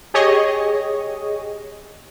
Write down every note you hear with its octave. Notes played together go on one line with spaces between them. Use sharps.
G4 G#4 C#5 D#5